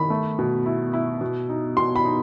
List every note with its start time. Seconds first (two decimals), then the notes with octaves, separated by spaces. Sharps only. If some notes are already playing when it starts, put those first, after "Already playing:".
Already playing: D#3 B5
0.10 A3
0.39 B2
0.66 E4
0.93 E4
1.21 B2
1.49 D#4
1.77 B2 C6
1.96 B5
2.05 D#4